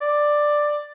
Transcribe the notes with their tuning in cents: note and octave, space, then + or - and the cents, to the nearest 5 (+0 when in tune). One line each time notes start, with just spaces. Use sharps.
D5 +10